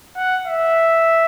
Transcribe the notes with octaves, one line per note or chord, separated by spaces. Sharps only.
F#5
E5